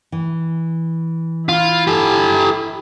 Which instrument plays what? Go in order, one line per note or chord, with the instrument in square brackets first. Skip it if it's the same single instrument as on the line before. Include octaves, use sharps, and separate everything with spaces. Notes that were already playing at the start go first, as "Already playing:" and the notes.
[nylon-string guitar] E3
[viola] E4 [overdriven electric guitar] F4
[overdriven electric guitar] G4 A4